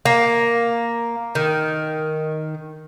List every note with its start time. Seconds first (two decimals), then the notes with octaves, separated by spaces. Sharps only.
0.05 A#3
1.35 D#3